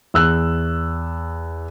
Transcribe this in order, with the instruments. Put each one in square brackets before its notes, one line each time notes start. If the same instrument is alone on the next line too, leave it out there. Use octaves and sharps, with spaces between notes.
[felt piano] E2 E6 F#6